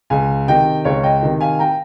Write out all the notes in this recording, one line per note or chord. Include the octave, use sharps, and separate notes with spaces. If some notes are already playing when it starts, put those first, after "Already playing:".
C#2 F5 G#5
C3 D#3 D#5 G5
C#2 C#5 F5
D#5 G5
C3 D#3
F5 G#5
G5 A#5